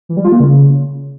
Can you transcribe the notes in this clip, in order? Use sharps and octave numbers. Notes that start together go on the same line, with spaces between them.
E3
G3
F4
A#3
C#3